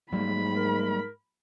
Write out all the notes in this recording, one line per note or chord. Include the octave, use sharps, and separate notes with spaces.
G#2 F#3 G3 A#3 B5
A#4